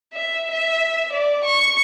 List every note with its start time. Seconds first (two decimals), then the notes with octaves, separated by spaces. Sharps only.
0.14 E5
0.52 E5
1.13 D5
1.45 C#6